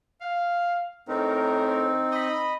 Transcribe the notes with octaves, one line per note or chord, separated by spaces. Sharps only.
F5
A2 C4 C#4 D#4 A#4
D#5 B5